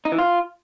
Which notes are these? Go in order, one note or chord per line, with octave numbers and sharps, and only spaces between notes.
D#4
E3
F4